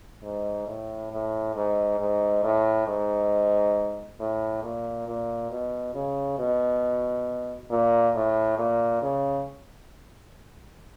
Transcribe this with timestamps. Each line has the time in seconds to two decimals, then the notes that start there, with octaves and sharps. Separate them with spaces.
0.23 G#2
0.67 A2
1.12 A2
1.56 G#2
2.00 G#2
2.44 A2
2.87 G#2
4.20 A2
4.63 A#2
5.07 A#2
5.51 B2
5.95 C#3
6.39 B2
7.70 A#2
8.15 A2
8.58 A#2
9.02 C#3